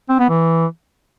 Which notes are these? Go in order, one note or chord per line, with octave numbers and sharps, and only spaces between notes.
C4
B3
E3